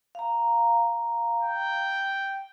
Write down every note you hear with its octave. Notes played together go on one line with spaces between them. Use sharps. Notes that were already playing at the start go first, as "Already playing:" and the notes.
F5 A#5
G5